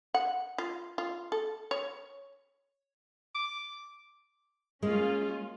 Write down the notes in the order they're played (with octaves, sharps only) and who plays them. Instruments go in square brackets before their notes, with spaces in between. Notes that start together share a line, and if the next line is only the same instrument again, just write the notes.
[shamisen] F#5
F4
F4
A4
C#5
[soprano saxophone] D6
[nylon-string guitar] G#3 [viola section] A#3 C#4 F4